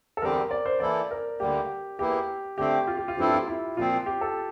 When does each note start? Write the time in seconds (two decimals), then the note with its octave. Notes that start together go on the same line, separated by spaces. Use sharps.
0.17 A4
0.21 E2 D3 G3 C4 G4 A#4
0.51 D5
0.66 C5
0.80 E3 A#3 E4 A4 D5
1.11 A#4
1.40 D2 D3 G3 A#3 G4
1.99 E2 E3 A#3 E4 G4
2.58 D3 A3 C4 G4
2.87 F4
2.97 G4
3.08 F4
3.17 G2 F3 C4 E4 G4 A4
3.33 F4
3.48 E4
3.77 A#2 F3 C4 F4
4.06 G4
4.21 A4